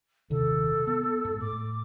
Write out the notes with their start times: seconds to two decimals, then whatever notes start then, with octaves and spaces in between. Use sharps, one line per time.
0.30 D#1 C3 D#3 A4
0.87 B3
1.25 G#2
1.40 A2 D6